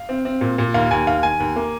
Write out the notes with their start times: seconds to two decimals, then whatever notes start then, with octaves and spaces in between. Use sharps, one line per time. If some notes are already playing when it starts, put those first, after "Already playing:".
Already playing: F5
0.09 C4
0.25 C4
0.41 A#2
0.58 A#2
0.74 D#2 F5
0.91 D#2 G#5
1.07 D#2 F5
1.23 D#3 G#5
1.40 D#2
1.56 A#3